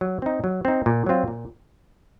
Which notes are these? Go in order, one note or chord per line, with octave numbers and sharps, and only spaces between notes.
F#3
C4 D#4
F#3
C4 D#4
A#2
F#3 C4 F4
A#2